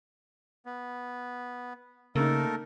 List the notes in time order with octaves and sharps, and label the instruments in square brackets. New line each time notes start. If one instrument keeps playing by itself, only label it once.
[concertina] B3
[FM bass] C#3 [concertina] A3 A4 A#4 [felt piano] A#3 D#4